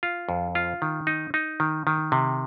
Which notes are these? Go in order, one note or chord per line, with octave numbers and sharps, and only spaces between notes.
F4
F2
F4
D#3
D#4
D#4
D#3
D#3
C3